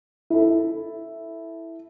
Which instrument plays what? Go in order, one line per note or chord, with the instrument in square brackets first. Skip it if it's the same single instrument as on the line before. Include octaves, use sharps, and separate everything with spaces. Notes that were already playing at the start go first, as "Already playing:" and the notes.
[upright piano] E4 A4